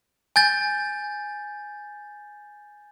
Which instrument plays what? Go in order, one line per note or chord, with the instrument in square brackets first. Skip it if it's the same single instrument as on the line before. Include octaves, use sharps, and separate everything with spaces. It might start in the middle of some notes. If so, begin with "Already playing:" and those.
[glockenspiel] G#5 G6 A6